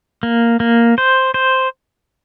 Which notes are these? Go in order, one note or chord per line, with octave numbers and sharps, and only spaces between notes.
A#3
A#3
C5
C5